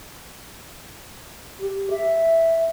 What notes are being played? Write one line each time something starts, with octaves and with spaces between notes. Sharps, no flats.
G4
E5